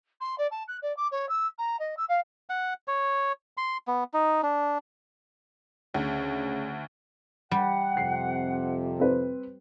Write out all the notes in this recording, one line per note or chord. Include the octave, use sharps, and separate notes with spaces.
C6
D5
A5
F#6
D5
D6
C#5
E6
A#5
D#5
E6
F5
F#5
C#5
C6
B3
D#4
D4
D2 C#3
G3 F#5
F2 C3 C7
C4 B4